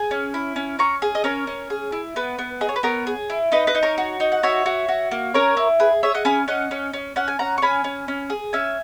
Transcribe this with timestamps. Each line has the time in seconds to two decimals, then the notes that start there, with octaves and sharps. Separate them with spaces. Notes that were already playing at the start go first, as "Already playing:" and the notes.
Already playing: G#4 G#5
0.11 C#4
0.34 E4
0.56 C#4
0.79 C#4 A#5 C#6
1.02 G#4
1.15 D#5
1.24 C#4 A#4 C#5
1.47 C#4
1.70 G#4
1.92 E4
2.16 B3 B4
2.39 B3
2.61 G#4 D#5
2.69 C#5
2.76 B4
2.83 B3 A#4 C#5
3.07 G#4
3.30 E4
3.52 D#4 B4 D#5
3.67 B4 D#5
3.75 D#4
3.83 A#4 C#5
3.98 F#4
4.20 D#4
4.32 F#5
4.43 F#4 C#5 E5
4.66 F#4
4.89 F#4
5.11 A#3
5.34 C#4 A#4 C#5
5.57 E4
5.80 G#4 B4
6.03 G#4 C#5 E5
6.14 D#5 F#5
6.25 C#4 G#5 B5
6.48 C#4 D#5 F#5
6.71 C#4
6.93 C#4
7.16 C#4 F#5
7.28 G#5
7.39 C#4 F#5 A#5
7.58 C#6
7.62 C#4 G#5 B5
7.84 C#4
8.08 C#4
8.30 G#4
8.53 C#4 E5 G#5